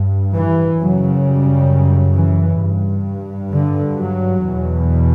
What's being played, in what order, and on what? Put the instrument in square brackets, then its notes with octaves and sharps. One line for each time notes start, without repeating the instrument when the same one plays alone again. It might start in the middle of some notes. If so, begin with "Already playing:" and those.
Already playing: [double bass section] G2
E3
F#2 C#3 F#3
G3
E3
G2
D3
F#3
E2 B2